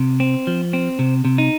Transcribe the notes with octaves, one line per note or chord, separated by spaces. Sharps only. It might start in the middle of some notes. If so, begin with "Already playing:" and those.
Already playing: C3
C4
F3
C4
C3
C3
D#4